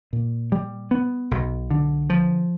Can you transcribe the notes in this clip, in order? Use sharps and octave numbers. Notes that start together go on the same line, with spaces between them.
A#2
G3
B3
B1
D3
F3